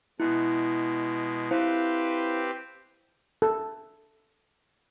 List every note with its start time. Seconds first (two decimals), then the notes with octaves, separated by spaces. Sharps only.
0.20 B2 G#3 E4
1.51 C4 E4 G4 B4 C5 F5
3.42 A4